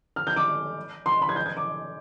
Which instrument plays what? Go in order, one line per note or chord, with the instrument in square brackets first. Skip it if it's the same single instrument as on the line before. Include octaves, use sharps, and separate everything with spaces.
[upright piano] F6
G6
D6
C6
B5
G#6
G6
G#6
D6